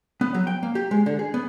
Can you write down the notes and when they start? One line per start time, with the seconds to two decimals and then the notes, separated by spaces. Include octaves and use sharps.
0.21 B3
0.34 F#3
0.47 G5
0.63 A#3
0.75 G4
0.91 G#3
1.06 D3
1.19 G#4
1.34 B3